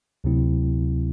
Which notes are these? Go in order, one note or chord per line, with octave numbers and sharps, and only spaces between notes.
D2 C3 F#3 C4 E4